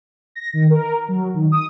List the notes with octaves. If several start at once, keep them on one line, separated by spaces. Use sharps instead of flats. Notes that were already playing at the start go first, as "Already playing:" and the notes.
A#6
D#3
A#4
F#3
D#3
D#6